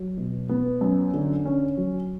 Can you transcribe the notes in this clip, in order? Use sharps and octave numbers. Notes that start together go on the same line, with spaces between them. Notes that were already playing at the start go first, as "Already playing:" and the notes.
Already playing: F#3
B2
B3
F#2
D3
C#4
F#3